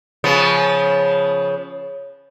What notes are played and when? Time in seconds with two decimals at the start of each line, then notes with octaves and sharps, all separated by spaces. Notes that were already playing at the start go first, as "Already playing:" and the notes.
0.24 C#3 F3 B3